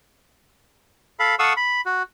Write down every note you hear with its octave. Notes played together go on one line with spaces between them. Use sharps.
A4 F5 B5
A4 F5 F#5 C#6 D#6 E6
B5
F#4